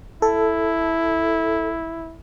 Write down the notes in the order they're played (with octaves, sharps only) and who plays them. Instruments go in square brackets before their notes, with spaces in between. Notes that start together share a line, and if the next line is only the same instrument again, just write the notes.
[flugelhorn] E4 [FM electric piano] A4